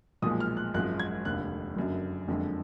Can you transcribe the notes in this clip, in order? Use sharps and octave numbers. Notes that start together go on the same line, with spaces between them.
B1 A#2 F3 G#3 D#6
F6
F#6
G#1 F#2 F3 G#3 F#6
G#6
F1 D#2 D3 F#6
F#1 F#2 D3 F#3
F#1 F2 D3 G#3